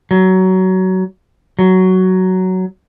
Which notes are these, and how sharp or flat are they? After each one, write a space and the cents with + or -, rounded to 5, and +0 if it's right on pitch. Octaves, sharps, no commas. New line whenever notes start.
F#3 +20
F#3 +10